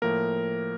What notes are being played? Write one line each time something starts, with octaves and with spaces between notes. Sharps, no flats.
A2 F3 A#3 A#4